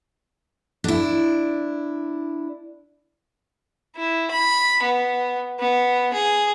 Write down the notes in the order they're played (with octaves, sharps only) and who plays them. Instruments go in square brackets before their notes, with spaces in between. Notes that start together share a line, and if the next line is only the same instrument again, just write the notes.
[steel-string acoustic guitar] D4 E4
[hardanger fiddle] E4
B5
B3
B3
G#4